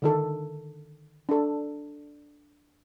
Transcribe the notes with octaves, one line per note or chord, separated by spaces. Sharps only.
D3 D#3 A4
D4 A4